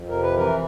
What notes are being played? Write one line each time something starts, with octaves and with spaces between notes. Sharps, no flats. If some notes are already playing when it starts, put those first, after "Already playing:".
Already playing: F2
C3 A#4
B4
E3 A#4